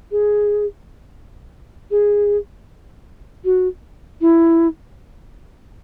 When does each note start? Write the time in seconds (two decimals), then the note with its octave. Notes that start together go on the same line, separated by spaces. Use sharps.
0.11 G#4
1.90 G#4
3.44 F#4
4.21 E4